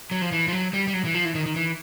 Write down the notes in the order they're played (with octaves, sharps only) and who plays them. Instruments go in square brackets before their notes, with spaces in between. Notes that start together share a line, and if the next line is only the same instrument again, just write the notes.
[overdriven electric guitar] F#3
F3
E3
F3
F#3
G3
G3
F#3
E3
F3
E3
D#3
D#3
E3